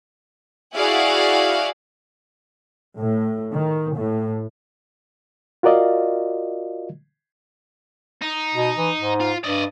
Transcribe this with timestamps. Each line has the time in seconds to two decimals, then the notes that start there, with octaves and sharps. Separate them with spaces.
0.75 E4 F#4 G#4 D5 F5 F#5
2.97 A2
3.52 D#3
3.95 A2
5.63 F4 F#4 A#4 D5 D#5 F5
8.22 D#4
8.55 B2
8.77 E3
8.99 G#2
9.20 F4
9.44 G2 D5 D#5